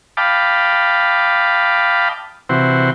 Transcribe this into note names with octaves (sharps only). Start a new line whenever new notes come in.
D#5 F5 G5 A5 B5 D6
C3 E3 F#4 C5